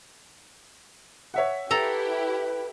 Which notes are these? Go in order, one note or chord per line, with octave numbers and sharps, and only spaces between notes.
C#5 E5 F#5
E4 G4 A4 B4 A#5